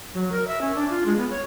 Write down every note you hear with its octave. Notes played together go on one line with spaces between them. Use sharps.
F#3
A#4
E5
C#4
D4
F4
G#3
B3
C#5